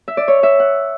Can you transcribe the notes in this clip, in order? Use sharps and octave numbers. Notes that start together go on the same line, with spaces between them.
E5
D5
C#5
E5
F#5